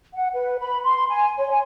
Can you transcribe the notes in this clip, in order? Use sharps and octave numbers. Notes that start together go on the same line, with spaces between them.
F#5
B4
B5
C6
G#5
C#5
G#5